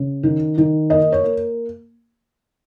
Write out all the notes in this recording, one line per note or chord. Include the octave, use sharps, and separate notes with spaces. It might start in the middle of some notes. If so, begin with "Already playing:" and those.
Already playing: C#3
D#3
D#3
A#3 D#5
C#5
A#3